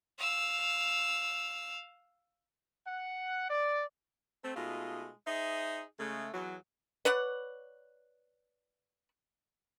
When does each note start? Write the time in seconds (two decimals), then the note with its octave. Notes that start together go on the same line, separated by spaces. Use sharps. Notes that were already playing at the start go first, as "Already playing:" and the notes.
0.19 F5 E6
2.87 F#5
3.50 D5
4.44 A3 C4
4.56 B2 G#3 A3 D#4 F4
5.27 D#4 G#4 C5 E5
6.00 C#3 G#3 A3
6.34 E2 F#3
7.05 B4 C#5 D5 F#5